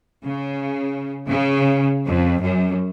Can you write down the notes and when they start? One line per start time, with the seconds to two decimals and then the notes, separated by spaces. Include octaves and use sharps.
0.24 C#3
1.28 C#3
2.05 F2
2.41 F#2